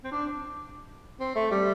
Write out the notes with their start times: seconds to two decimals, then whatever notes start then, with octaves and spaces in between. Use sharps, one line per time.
0.04 C4
0.12 D4
1.20 C4
1.35 A3
1.51 G3